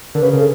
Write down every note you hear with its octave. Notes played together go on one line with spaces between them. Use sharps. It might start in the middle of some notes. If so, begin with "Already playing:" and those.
D3 A#4
C#3 B4
A#4
C#3
A4